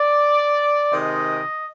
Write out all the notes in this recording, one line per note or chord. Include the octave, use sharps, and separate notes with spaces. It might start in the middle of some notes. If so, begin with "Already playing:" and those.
Already playing: D5
C3 D#3 G#3 D#5